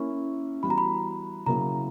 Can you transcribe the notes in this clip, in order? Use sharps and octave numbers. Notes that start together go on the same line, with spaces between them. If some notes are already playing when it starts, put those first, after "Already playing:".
Already playing: A#3 C#4 E4 C#6
E3 G3 B3 F#4 B5
A#5
B5
C#3 F#3 A#3 E4 A#5